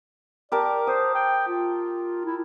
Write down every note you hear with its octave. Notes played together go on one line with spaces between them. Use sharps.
G4 A#4 D5 A5
C5 D#6
G5
F4
E4